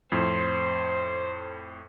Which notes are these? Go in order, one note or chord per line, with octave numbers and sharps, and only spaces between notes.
F2 A2 C5